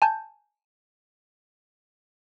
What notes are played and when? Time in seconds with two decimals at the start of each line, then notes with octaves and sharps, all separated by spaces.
0.02 G#5 A5 G6